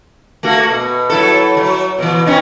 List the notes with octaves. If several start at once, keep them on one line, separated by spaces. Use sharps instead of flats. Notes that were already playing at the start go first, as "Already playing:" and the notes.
A3 A#3 F#4
B2
F#3 E4 A4
F#3
B2 E3
C4 C#4 D#4